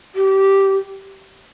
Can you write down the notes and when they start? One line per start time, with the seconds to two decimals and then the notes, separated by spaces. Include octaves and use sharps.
0.15 G4